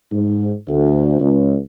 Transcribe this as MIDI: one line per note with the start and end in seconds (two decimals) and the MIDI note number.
0.12 0.52 44
0.68 1.18 38
1.20 1.57 37